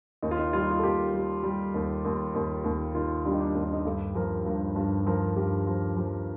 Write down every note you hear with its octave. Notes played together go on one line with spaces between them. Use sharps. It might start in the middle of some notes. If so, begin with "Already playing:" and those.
D#2 D#4
F4
D#4
G3 F4
D#4
F4
A4
D#2 G4
G3
G3
D#2
D#2
D#2
D#2
D#3 F4
G3 D4
D#4
D4
D#2 D#4
D4
D#4
G2 A4
F3 A#4
G2 A#4
G2
F3 A#4
G2 G4
F3
F3